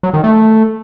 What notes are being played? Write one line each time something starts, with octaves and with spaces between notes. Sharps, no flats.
F#3
D#3
A3